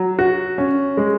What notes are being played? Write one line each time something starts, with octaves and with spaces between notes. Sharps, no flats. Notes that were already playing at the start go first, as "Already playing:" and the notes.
Already playing: F#3
F#4
C#4
G#3